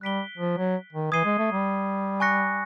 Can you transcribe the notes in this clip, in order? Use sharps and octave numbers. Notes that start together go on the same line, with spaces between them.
G3 F#6 B6 D7 G7
F3
F#3
D#3
E3 D#6 G#6 C7 D#7 G7
G#3
A3
G3
G#5 C#6 F#6 A#6 C#7